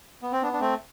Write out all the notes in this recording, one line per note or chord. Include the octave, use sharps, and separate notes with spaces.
B3
C4
B3 D4
D4
A3 C4